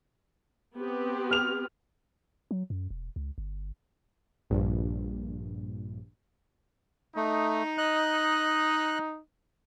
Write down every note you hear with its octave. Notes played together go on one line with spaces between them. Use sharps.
B3 C4 G4
F6 F7
F#3
F#2
E1
C#2
G1
A#1 G2
A3 D#4
D#5 F#6